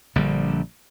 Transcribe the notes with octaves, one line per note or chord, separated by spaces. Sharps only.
A#1 D3 G3